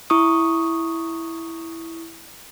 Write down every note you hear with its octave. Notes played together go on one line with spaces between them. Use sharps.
E4 C#6 D#6